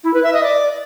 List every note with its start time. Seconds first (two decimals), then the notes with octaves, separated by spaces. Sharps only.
0.04 E4
0.13 B4
0.23 E5
0.33 D#5
0.42 D5